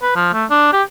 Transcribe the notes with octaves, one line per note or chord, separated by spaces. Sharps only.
B4
F3
A3
D4
G4